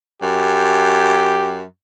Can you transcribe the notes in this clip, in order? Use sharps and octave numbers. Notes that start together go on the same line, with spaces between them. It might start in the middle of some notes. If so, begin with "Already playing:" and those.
F#2 G4